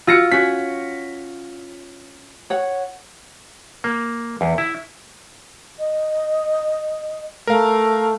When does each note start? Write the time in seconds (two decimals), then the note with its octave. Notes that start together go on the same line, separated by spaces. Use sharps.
0.07 F4 F#4 E6 A#6 C#7
0.32 C#4 F#4 C#5 B6
2.50 C#5 F#5
3.84 A#3
4.41 E2
4.58 E4
5.79 D#5
7.47 A3 A#4 F5